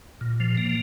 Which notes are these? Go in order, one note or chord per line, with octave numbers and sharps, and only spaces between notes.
A#2
F3
A#3